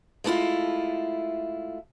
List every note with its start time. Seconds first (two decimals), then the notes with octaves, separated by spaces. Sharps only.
0.24 G#3 A3 C#4 E4 F4